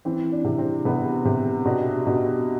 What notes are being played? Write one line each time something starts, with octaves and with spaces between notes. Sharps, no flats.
E3 C4
D4
C3
C4
C3 B3
C3 C4
B2 D4
B2